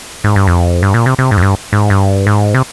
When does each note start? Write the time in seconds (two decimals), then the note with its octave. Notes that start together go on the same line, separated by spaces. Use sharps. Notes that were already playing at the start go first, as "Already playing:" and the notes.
0.24 G#2
0.36 G2
0.47 F2
0.82 G2
0.94 A#2
1.06 C3
1.18 C3
1.31 G#2
1.37 F2
1.42 G2
1.73 G#2
1.90 G2
2.27 G#2
2.54 C3